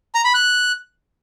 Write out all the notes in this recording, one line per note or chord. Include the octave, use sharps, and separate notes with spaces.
A#5
B5
F#6